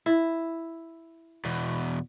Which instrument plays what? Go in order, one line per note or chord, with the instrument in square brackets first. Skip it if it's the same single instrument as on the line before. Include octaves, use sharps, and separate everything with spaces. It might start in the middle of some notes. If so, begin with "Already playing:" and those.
[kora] E4
[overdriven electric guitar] E2 B2